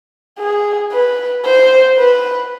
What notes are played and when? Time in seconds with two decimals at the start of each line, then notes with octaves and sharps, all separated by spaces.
0.39 G#4
0.92 B4
1.45 C5
1.97 B4